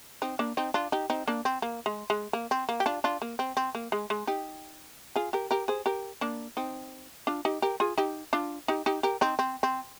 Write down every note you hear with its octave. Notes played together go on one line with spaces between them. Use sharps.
C4 D#4
A#3 D4
C4 D#4
D4 F4
D#4 G4
C4 D#4
A#3 D4
C4
A#3
G#3
G#3
A#3
C4
A#3
G4
D4 F4
D4 F4
A#3
C4
C4
A#3
G#3
G#3
D#4 G4
F4 G#4
G4 A#4
G4 A#4
G#4 C5
G4 A#4
A#3 D4
C4 D#4
D4 F4
D#4 G4
G4 A#4
F4 G#4
D#4 G4
D4 F4
D#4 G4
D#4 G4
G4 A#4
C4 D#4
C4
C4